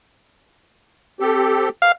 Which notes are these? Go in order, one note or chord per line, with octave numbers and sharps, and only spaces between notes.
C4 G4 A4
F5